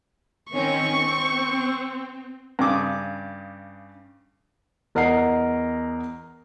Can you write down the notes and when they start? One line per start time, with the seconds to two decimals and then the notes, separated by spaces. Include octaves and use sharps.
0.53 D#3 C4 C#4 C#6
0.97 C4
2.59 G2 C#3 D6 D#6
4.95 E2 A#4 D#5 F#5 A#5 C7